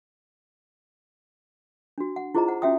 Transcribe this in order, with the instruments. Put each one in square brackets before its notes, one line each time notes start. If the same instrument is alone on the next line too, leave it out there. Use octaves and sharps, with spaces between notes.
[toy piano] D4 F#4
F#5
E4 F4 G#4 C5 D#5 A#5
C5 F#5
C#4 F#4 E5 G5 D#6